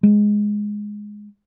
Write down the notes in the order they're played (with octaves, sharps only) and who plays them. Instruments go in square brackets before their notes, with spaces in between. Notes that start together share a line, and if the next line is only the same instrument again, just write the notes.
[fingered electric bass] G#3